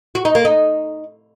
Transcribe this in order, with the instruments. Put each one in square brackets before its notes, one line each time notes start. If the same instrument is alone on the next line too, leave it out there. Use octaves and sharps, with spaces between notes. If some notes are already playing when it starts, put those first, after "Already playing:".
[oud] F#4
D#4
A#3
D#4